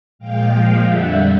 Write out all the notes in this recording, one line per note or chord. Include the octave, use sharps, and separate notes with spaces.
A#2 F3 G#3 F5 G5
F5 G5
F2 D3 G3 E5 F#5